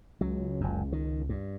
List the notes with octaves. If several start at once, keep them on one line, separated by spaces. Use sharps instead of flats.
C#2 F#3
F#1 F#2
D#3
G2